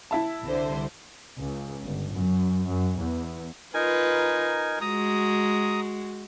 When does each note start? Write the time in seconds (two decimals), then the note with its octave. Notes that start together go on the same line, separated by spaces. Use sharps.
0.11 E4 E5 A5
0.43 C2 D3 C5
1.39 C#2
1.83 G1
2.14 F#2
2.68 F#2
2.98 E2
3.74 D#4 F4 A#4 B4 G#5
4.81 G#3 F#4 A#5 D#6